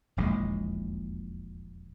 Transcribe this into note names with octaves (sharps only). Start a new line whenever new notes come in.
D#1 A#1 E2 G#3